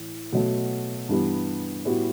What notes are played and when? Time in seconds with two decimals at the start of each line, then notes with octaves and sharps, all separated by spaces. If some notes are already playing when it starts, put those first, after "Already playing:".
Already playing: A2 E3
0.32 B2 F#3 A3
1.09 G2 E3 G3 B3
1.85 A2 G3 B3 F#4